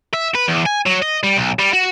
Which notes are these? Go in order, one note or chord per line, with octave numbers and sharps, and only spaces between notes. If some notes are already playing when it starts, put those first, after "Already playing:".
E5
B4
E2
G#5
F#3
D#5
G3
B1
G3
F#4